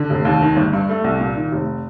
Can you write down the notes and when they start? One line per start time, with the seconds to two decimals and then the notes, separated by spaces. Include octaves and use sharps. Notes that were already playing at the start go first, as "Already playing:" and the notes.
Already playing: D3
0.10 F1
0.25 D#2
0.42 D#3
0.56 G1
0.73 G2
0.89 A3
1.04 C2
1.21 A#2
1.36 D#3
1.52 F1